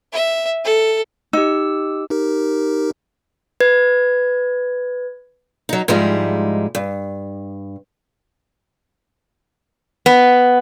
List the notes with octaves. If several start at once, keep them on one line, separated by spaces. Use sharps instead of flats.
E5
A4
D#4 G4 E6
D#4 G4 A#4
B4 G#6
F#3 D#4
G#2 F3 G3 G#3 D#4 E4
G2
B3